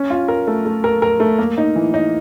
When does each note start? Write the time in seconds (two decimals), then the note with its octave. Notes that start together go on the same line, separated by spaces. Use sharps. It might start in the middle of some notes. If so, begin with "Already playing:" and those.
Already playing: C#4
0.10 F4
0.28 A#4
0.47 A3
0.65 A3
0.84 A#4
1.02 A#4
1.20 A3
1.39 A#3
1.58 D#4
1.76 E3
1.94 D#4